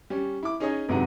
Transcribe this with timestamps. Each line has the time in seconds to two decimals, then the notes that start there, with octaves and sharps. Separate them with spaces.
0.10 G3 C#4
0.43 E4 D6
0.60 C#4 D#4 G#4 C#5 D#5
0.89 G1 G#2 C3 F#3 D#4 F#5